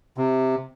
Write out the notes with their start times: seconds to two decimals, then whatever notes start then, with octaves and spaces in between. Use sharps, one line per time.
0.18 C3